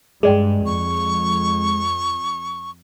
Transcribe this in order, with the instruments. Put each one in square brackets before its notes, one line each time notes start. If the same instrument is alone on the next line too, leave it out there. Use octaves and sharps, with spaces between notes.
[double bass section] G2 [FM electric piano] G#3 [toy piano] G#4 D5 G5
[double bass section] F2 [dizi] C#6